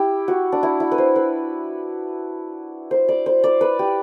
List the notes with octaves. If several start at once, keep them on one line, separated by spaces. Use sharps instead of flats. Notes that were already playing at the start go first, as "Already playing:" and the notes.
Already playing: E4 G4
F#4
D4
E4
E4
B4
C5
B4
C5
D5
C5
D5
B4
G4